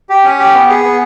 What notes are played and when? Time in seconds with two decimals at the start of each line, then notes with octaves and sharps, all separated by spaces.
0.09 G4
0.24 C#4
0.39 G4
0.54 B3
0.69 G#4
0.84 B3